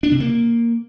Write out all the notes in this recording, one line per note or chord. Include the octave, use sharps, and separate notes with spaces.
D4
C3
A#3